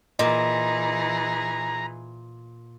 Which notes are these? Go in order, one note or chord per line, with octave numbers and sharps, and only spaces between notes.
A#2 E3 D#4 G#4 D#5 A#5